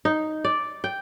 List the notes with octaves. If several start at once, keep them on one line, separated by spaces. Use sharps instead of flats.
D#4
D5
G5